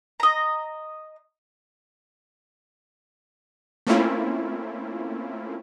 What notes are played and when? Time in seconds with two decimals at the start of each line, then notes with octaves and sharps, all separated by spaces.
0.20 D#5 A#5
3.87 A3 A#3 C4 C#4 E4 F4